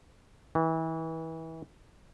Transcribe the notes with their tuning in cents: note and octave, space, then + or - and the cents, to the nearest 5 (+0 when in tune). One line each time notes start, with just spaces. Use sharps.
E3 -30